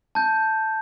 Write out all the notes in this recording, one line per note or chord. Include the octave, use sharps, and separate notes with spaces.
A5 G6